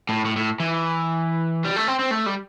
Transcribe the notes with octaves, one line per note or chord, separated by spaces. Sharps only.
A2
A2
A2
E3
G3
A3
C4
C4
A3
G3